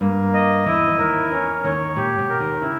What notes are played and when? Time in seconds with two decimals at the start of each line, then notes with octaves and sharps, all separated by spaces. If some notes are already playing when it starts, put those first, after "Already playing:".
0.01 G2 G3 A#3
0.34 D#5
0.66 E2 E3 E4
0.89 E3
0.99 D#2 D#3 A#4
1.31 E2 E3 C#4
1.64 D#2 D#3 C#5
1.96 A#2 G4
2.18 B2
2.30 A#4
2.40 D#2 D#3
2.61 C#3 E4